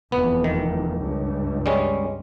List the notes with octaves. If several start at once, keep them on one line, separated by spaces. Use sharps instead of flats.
F1 E2 B3
D#3
C#2 G2
G3 G#3 C#4